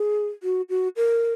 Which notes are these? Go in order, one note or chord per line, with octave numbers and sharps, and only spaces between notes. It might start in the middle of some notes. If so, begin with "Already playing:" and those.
Already playing: G#4
F#4
F#4
A#4